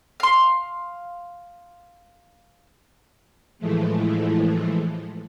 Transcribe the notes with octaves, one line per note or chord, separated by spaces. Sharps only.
F5 C6
A2 E3 F3 G#3 A3